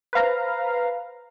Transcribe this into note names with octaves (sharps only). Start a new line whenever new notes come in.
B4 C5 F5 A#5